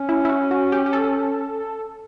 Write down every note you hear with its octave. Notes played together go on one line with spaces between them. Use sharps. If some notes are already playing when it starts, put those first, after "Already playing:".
Already playing: C#4
E4
E4
F#4
F#4
G4
G4
A4